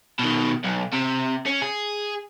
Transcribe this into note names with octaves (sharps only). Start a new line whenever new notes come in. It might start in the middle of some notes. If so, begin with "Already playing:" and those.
B2 D#3
B1
C3
C#4
G#4